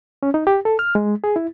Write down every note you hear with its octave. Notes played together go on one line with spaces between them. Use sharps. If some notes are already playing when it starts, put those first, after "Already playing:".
C#4
D#4
G4
A4
F6
G#3
G#4
E4